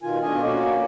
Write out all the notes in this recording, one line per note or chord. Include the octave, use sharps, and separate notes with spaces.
B2 D#3 F4 G#5
B2 A3 D4 F4 D#5 G#5
A#3 C#4 F#4 D5